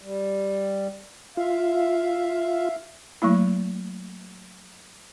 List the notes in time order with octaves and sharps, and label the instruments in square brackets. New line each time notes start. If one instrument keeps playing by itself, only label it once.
[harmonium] G3
[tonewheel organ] F4 [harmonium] E5 F5
[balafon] F#3 A3 A#3 E4